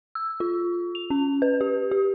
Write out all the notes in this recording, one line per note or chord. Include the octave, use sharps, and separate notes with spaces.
E6
F4
F7
C#4
B4
G4
G4